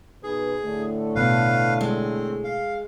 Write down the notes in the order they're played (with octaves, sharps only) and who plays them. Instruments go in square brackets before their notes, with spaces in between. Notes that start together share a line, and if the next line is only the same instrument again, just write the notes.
[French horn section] B2 D#4 B4 [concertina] G#4
[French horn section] A2 D3 A3
[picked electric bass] A1 B2 [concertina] B4 F5
[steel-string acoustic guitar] G#3 [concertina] C4
[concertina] F5